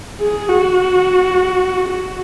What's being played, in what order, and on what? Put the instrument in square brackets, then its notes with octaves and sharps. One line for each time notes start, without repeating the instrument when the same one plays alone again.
[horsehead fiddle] G#4
F#4
F#4